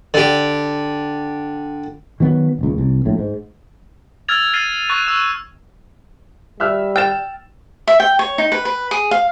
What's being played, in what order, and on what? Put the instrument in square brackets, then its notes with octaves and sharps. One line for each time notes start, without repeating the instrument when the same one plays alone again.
[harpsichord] D3 G4
[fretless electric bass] D#3 F#3 B3
D#1 C#2
C2
A#1 A2
G#2
[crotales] E6 F6 G#6 A6 F7
F6 A6 C7 D#7
C#6 F#6 A6 D#7
E6 F#6 E7
[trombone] G3 [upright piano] E5 E6 F6
[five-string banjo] G5 [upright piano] F6 A6 E7
[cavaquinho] E5
G5
C#5
D#4
B4
B4
G#4
F5